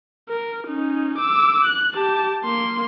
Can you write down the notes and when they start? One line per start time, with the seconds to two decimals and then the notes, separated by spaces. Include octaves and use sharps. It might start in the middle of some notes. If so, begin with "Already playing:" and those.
0.30 A#4
0.68 C#4 D#4
1.18 D6 E6
1.65 F#6
1.94 G4 A5
2.44 A#3 C6